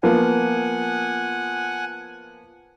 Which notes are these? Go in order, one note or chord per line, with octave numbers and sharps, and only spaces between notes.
F3 A#3 B3 F#5 G#5